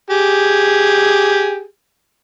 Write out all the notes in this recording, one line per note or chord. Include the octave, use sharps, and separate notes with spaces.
G4 G#4